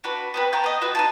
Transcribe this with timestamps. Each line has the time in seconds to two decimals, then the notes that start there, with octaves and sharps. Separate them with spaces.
0.04 D4 F#4 B4
0.34 B3 C4 B4
0.53 G5 A5 A#5 C#6
0.64 B3 D#5
0.81 F4 F#4 B4
0.95 D#4 G#4 A5